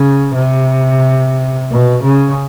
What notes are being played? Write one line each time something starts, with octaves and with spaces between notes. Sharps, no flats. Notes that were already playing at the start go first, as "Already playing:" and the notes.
Already playing: C#3
C3
B2
C#3